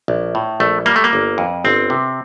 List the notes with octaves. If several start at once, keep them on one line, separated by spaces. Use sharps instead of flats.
A#1
A2
A#1 A3
G3 A#3
A3
A#3
G1
F2
G1 C4
C3